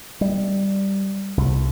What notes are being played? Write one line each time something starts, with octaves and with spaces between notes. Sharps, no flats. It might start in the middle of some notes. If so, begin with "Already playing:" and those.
G3
C2